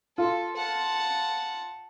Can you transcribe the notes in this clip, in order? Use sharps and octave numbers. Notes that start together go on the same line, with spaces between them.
F4 A4
F#5 A5